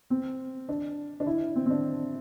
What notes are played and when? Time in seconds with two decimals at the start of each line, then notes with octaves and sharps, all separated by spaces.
0.10 C4
0.69 D4
1.20 D4
1.26 E4
1.56 C4
1.66 C4
1.71 D4